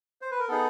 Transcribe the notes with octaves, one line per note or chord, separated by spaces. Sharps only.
C5
B4
A#4
B3 D#4 G#4 A4